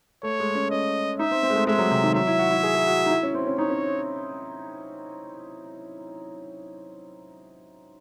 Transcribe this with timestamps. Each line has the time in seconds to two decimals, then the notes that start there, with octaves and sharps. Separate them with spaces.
0.23 A3 C#5
0.40 G#3
0.55 C#4
0.71 C#4 D#5
1.19 D#4 E5
1.31 C4
1.43 C4
1.50 G#3
1.55 A3
1.67 G#3 E5
1.79 F#3
1.91 C3
2.03 D#3
2.14 F#3 E5
2.27 E4
2.39 F#4
2.51 E4
2.63 G#4
2.75 G#4
2.87 F#4
3.06 D#4
3.11 E4
3.23 C#4
3.35 C4
3.47 C#4
3.58 D#4 C#5
3.69 C#4